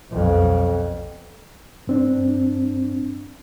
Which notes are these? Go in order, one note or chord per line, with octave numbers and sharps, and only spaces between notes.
B1 F2
G2 C4 D4